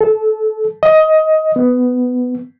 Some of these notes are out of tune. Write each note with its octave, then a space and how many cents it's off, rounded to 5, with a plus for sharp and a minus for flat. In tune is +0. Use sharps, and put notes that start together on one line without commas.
A4 -20
D#5 +15
B3 +15